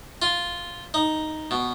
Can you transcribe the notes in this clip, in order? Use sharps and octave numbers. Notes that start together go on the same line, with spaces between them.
F4
D#4
B2